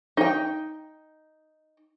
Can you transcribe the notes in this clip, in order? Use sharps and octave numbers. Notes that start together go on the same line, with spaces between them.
D#4 G5